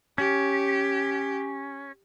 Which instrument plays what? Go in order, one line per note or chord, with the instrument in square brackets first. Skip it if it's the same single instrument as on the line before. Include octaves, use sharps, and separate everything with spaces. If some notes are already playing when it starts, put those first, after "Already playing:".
[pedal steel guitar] C#4 [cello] G4